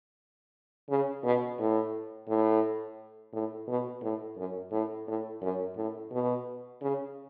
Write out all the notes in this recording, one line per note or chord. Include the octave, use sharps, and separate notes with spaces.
C#3
B2
A2
A2
A2
B2
A2
F#2
A2
A2
F#2
A2
B2
C#3